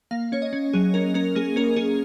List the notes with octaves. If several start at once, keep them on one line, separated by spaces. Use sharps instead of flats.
A#3 F5
C#4 C#5
D#5
C#4
F#3 G#4
C#4 A#4
C#4 A#4
A#3 G#4
C#4 A#4
C#4 G#4